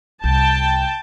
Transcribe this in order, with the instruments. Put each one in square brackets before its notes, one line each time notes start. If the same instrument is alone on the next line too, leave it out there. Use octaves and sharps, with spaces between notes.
[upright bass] C2 [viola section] G5 A5